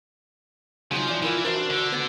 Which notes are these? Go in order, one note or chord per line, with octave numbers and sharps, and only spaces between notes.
C#3 F3 F#3 D#4 C5
E3 D5
E3 E4 F4 A#4 F5
D4 F#4 A#4 C5 E5
D3
B3 B4